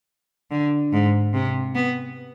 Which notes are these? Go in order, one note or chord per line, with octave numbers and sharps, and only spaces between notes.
D3
G#2
C3
B3